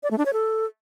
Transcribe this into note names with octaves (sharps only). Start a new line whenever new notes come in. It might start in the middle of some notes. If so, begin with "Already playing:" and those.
D5
A3
D4
C#5
A4